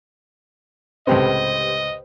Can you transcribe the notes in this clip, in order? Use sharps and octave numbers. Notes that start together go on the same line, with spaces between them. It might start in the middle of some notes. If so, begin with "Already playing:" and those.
C#2 A2 C3 G4 B4 C5 D#5